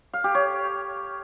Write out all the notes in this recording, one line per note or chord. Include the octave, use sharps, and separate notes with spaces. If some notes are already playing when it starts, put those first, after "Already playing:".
F5
G4
C#5